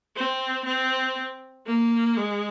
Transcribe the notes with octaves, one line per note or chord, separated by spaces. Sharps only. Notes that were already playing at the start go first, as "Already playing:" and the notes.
C4
C4
A#3
G#3